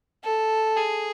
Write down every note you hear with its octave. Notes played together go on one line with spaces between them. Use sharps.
A4
G#4